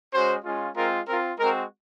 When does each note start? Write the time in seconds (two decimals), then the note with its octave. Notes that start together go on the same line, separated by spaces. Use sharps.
0.13 G#3 C#4 F#4 C5
0.44 G#3 C#4 F4
0.76 G#3 C4 F4 A#4
1.07 C4 F4 A#4
1.39 G#3 C4 F#4 A#4